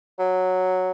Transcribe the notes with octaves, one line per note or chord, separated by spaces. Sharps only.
F#3